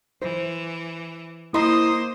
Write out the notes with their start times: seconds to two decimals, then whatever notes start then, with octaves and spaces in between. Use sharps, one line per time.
0.22 E3 C5
1.54 A#3 E4 C5 D#5 A#5 C6 D#6